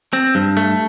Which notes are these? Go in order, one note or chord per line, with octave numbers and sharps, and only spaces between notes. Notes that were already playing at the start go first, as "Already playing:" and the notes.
C4
G2
A3